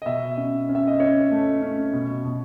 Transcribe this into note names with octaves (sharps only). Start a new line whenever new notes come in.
D#5
B2 E5
C#4
C#4
E5
D#5
C#4 C#5
A3
C#4
B2
B2